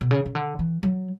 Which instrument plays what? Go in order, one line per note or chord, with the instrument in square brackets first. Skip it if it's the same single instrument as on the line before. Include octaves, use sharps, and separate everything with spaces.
[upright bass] B2
C#3
C#3
D3
E3
F#3